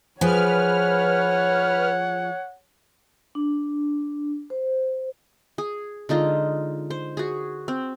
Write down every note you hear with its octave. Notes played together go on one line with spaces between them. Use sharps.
F3 G#4 B4 C#5 F#5 F6
D4
C5
G#4
D3 G#3 D#4 F4
C5
F#4 G#4
C4